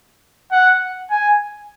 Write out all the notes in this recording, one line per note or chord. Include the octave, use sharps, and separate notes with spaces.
F#5
G#5